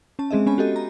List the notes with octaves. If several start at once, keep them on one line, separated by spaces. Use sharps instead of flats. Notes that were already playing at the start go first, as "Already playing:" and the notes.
C#4 A5
G#3 C4 G#4 D#5 E5
B3 C#4 G#5 B5
F#4 G4 A4 D#5
A#5